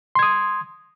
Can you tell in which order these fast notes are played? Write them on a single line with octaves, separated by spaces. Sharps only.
C6 G#6 D#6